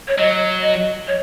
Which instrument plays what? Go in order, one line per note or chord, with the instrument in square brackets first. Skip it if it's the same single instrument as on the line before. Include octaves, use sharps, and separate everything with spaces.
[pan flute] C#5
[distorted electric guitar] F#3 [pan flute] D#5
[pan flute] D#5
C#5